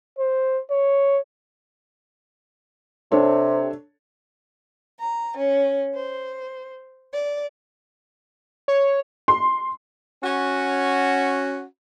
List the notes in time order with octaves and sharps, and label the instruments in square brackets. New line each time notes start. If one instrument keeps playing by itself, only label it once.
[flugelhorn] C5
C#5
[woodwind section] C3 [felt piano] D4 A4 C#5
[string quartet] A#5
C#4
C5
D5
[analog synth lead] C#5
[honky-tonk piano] C6
[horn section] C#4 F#4